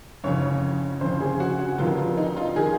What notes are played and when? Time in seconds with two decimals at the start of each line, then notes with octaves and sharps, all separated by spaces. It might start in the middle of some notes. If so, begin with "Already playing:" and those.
0.24 F#1 F2 C#3 C#5
1.01 F#1 F2 C#3 C5
1.21 G#4
1.40 F#4
1.59 F#4
1.78 F1 F2 D#3 F4
1.97 F4
2.17 D#4
2.37 F4
2.56 D#3 G#4